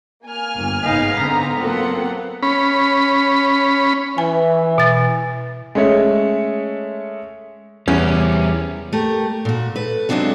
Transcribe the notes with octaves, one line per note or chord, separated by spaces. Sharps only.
A#3 G#5 F6
G1
G#1 C#3 B3 D#4 F5
D3 B3 C4 A#5
F#3 A#3 C4 F4 A4 F#5
C#4 B5
E3 G#5
B2 A6
G#3 A3 C#4 C#5 E5
E2 G3 C#4 E4
A3 G4 A#4
A#2 F#4
A4 B4
F#3 G#3 C4 D4 F4 F#4